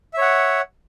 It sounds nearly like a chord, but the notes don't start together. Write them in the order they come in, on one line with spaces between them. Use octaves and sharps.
E5 C#5 F#5